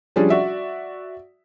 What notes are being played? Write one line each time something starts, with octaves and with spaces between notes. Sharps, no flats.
F3 G3 C#4 D4 G#4
F#4 D5 E5